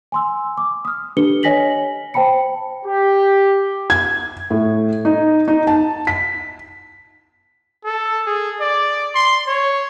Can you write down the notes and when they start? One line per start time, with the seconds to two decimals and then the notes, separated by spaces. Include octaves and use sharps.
0.12 G#5 C6 E6
0.58 D6
0.85 D#6 F6
1.17 D4 G4 A4 B4 C#7 G7
1.43 C#5 D#5 G#5 A#6 B6 F#7
2.14 C5 G5 A5 B5 C#7
2.86 G4
3.90 G#6
4.51 A2
5.05 D#4
5.48 D#4
5.67 A5
6.07 B6
7.85 A4
8.26 G#4
8.61 D5
9.15 C6
9.48 C#5